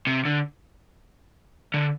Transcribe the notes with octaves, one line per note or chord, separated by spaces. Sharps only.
C3
D3
D3